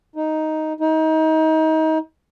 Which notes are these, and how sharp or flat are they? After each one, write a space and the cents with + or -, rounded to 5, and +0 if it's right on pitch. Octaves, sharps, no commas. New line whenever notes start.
D#4 +5
D#4 +30